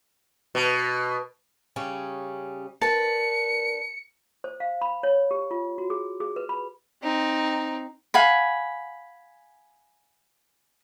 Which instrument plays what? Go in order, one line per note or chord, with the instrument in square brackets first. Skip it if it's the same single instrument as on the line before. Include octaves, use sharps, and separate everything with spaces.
[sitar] B2
[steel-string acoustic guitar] C#3 G3 C#4
[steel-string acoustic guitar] D4 B4 [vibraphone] A#4 [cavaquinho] A5 [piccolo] C#7
[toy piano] C5
F5
B5
C#5
G4
F4
F#4
G#4
G#4
B4
B5
[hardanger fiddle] C4 D#4
[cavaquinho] F5 F#5 G#5 B5